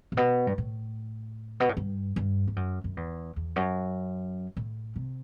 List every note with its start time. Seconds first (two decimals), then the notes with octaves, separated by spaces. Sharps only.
0.12 A2
0.17 B2
0.47 G2
0.58 A2
1.60 B2
1.69 A2
1.77 G2
2.16 G2
2.47 G2
2.56 F#2
2.84 F#2
2.97 E2
3.36 E2
3.56 F#2
4.57 A2
4.96 C3